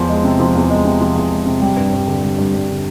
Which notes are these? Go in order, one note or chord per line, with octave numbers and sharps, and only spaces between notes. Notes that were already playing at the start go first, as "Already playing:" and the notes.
Already playing: E2 F3
G#3
C3
F3
E2
G#3
C3
F3
E2
G#3
C3
G3
G2
G2
D3
G3
G2
G2
D3